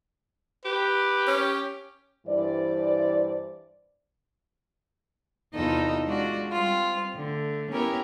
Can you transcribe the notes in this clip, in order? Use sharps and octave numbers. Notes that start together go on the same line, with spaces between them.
G4 B4
C#4
G2 E3 C5 D5
E2 C3 D#4 F4 A4 D#5
G#3 D4 F4 F#4 D5
G3 C4 F4
D3 A3
B3 C#4 E4 G4 A#4